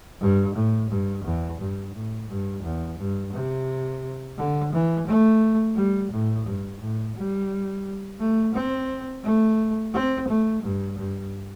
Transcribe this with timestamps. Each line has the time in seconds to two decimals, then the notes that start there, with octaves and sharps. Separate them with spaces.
0.21 G2
0.55 A2
0.90 G2
1.25 E2
1.60 G2
1.94 A2
2.29 G2
2.64 E2
2.99 G2
3.33 C3
4.37 D3
4.73 E3
5.07 A3
5.76 G3
6.12 A2
6.46 G2
6.81 A2
7.16 G3
8.20 A3
8.54 C4
9.24 A3
9.94 C4
10.28 A3
10.63 G2
10.98 G2